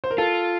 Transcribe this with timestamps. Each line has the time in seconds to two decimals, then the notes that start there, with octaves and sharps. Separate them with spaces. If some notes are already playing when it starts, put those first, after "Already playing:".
0.04 C5
0.11 A#4
0.18 F4 A4